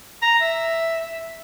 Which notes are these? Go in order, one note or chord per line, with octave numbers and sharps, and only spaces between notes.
A#5
E5